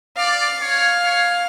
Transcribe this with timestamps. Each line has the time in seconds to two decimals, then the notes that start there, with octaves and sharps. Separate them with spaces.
0.17 D5 F5
0.61 C#5
1.05 C#5